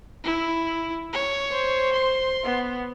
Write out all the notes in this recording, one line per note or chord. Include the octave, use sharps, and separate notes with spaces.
E4
C#5
C5
C6
B3